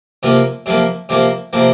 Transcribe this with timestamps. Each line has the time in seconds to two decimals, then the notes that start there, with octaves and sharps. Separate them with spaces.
0.23 C3 F3 A#3
0.66 C3 F3 A#3
1.09 C3 F3 A#3
1.53 C3 F3 A#3